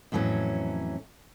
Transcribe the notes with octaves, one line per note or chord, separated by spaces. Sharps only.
F2 A2 E3 F#3 C#4